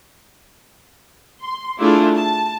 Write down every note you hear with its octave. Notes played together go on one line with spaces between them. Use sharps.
C6
A3 D4 E4 F4 G#4 D5
A5